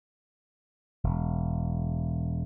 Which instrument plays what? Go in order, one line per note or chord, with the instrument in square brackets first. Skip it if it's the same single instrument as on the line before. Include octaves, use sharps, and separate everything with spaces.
[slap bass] E1